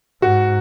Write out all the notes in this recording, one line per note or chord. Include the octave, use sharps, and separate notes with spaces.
G#2 F#4